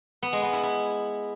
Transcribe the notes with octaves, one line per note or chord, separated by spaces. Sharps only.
B3
G#3
B3
E4
E4